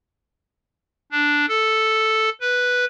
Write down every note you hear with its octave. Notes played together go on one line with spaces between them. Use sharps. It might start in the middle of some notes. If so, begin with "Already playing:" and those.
D4
A4
B4